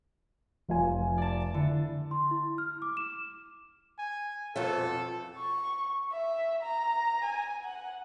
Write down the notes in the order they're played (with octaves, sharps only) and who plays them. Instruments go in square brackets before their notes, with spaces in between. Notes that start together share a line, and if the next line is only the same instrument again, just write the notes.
[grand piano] F1 F4 G#5
[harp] D5 A5
[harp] D3 [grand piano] E4
[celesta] C6
E4
F6
D6
E7
[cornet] G#5
[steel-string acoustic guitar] F2 B2 F3 [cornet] A4
[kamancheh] C#6
E5
A#5
G#5
F#5